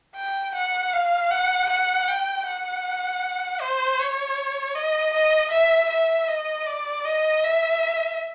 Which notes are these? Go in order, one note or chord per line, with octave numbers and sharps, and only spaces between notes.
G5
F#5
F5
F#5
F#5
G5
F#5
C5
C#5
D#5
D#5
E5
E5
D#5
D5
D#5
E5